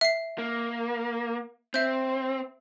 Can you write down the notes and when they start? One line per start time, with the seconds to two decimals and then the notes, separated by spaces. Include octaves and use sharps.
0.01 E5 C7
0.38 A#3
1.74 C4 E5 G6